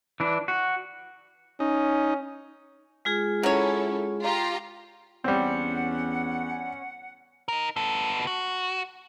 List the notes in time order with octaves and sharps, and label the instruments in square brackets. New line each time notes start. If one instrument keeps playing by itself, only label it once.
[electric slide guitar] E3 D4
F#4
[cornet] C#4 [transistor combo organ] D#4
[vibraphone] G#3 F4 G#4
[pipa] F#3 C#5 [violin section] C#4 E4 A4
[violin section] F4 G4 A#5
[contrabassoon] E2 [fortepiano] G3 C4 [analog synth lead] C#4 [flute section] F#5
[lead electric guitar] D#4 A#4
B3 A4
F#4